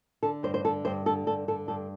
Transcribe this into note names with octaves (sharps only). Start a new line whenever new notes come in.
D3 A4
G2 C5
C5
D3 A4
G2 C5
D3 A4
G2 A4
D3 A4
G2 A4